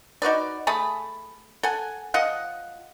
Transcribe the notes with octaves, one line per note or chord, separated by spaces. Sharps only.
D#4 F#4 B4 D5
A3 G#4 A5 B5
A4 F#5 G#5
F3 F4 D#5 F#5